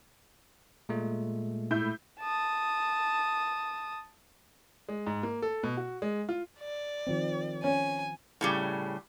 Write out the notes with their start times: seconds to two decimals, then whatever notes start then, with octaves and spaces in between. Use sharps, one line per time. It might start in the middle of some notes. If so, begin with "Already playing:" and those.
0.89 A#2 G#3 A3
1.71 A2 E4 G6
2.20 A5 D#6
4.89 G#3
5.07 G#2
5.23 A#3
5.42 A4
5.63 B2
5.77 F#4
6.02 G#3
6.29 F4
6.60 D5
7.07 D#3 F3 C4
7.64 C#4 G#5
8.41 A2 C#3 G3